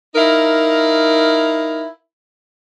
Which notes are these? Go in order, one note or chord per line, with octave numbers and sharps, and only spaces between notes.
D#4 E4 A#4 F5